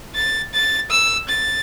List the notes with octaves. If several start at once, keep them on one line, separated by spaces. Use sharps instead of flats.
A6
A6
E6
A6